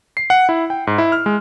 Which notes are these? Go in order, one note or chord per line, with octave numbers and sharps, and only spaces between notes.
C7
F#5
E4
G5
G#2
E4
F6
G#3